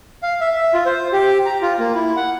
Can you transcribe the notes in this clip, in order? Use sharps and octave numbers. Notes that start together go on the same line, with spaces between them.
F5
E5
E5
F4
C5
G4
A#5
F4
A#3
E4
F#5